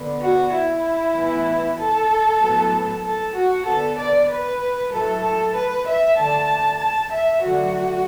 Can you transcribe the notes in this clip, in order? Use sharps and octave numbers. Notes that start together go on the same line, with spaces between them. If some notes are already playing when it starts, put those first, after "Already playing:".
Already playing: D3 B3
F#4
E4
A2 E3 B3
A4
A2 F#3 B3
A4
F#4
D3 B3 A4
D5
B4
A2 F#3 A3 A4
A4
B4
E5
D3 A3 A5
A5
E5
D3 F#3 A3 F#4